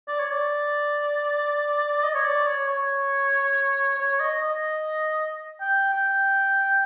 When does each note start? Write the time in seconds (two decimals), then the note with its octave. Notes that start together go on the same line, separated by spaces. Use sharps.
0.08 D5
0.19 C#5
0.31 D5
2.04 D#5
2.15 C#5
2.25 D5
2.47 C#5
2.68 C#5
3.99 C#5
4.20 D#5
4.42 D#5
5.61 G5
5.93 G5